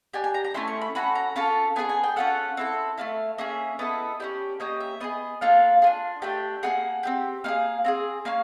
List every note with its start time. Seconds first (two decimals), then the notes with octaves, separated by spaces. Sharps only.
0.13 D4 G4 G#5
0.24 G#5
0.34 A#5
0.44 A#5
0.54 A3 C#4 E4 C6
0.67 C#6
0.81 B5
0.95 C#4 F#4 A4 B5
1.15 A#5
1.36 C#4 F4 A4 A5
1.76 B3 D#4 G#4 G#5
1.89 G#5
2.04 G5
2.16 C#4 F4 A4 F#5
2.57 C4 E4 A4
2.98 A3 C#4 E4 F5
3.38 A#3 C#4 G#4 E5
3.79 B3 E4 A4 D#5
4.20 C#4 E4 G4 D5
4.60 A#3 C#4 G4 D#5
4.80 E5
5.00 B3 D#4 G#4 D#5
5.41 A#3 D4 F4 A4 F5
5.82 D4 F4 G#4
6.22 A3 D4 G4 G5
6.63 A#3 D#4 G#4 F#5
7.03 C4 E4 G4
7.44 A#3 D#4 F5
7.48 G#4
7.85 C4 F4 G#4
8.25 A#3 C#4 F5